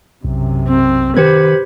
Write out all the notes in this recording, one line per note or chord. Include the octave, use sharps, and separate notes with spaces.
B1 F#2 C3
C4
D#3 G4 B4 C5 G#6